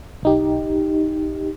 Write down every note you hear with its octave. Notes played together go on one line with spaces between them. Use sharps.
B1 D#4 G4